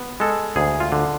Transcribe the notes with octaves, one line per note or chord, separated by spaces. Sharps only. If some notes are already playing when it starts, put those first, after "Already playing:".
Already playing: B3
G#3 A4
D2 G#4
F4
D3